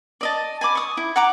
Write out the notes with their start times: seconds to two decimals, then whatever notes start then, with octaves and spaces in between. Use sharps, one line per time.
0.21 D5 D#5 A5
0.61 G#5 B5 D6
0.75 C#6 D#6
0.97 E4
1.16 F#5 A#5 D6